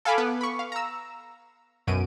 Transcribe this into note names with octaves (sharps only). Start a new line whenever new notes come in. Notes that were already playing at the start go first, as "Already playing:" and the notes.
A4 F5 G#5 B5 D6
B3 B4
B5 C#6
F5
A#5 E6
B1 F#2 D7 D#7